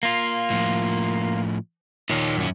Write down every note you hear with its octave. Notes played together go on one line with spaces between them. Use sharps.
A#3 F4
A2 F3
D#2 A#2 D#4 C#5
F#2 C#4